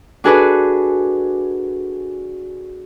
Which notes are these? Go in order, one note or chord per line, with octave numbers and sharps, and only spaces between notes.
D4 F#4 G#4 A4 B4 D5